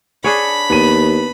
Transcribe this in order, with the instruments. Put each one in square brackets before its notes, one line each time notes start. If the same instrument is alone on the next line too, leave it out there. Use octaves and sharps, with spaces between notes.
[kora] D4 G#4 C#5 [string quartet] B5
[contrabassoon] D#2 [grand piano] B3 D#7